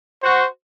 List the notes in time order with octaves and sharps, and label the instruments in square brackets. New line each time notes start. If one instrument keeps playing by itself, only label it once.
[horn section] F#4 [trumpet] C5